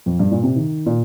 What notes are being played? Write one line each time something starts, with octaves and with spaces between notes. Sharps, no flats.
F2
G2
A#2
C3
D#3
A#2